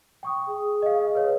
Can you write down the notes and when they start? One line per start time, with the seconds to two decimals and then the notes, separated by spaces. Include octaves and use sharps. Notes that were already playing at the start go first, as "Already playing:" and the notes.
0.23 G5 C#6 D#6
0.48 G#4
0.82 D#5 F5
1.15 B4 C#5